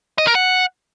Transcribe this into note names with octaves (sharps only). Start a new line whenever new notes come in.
D#5
A#4
F#5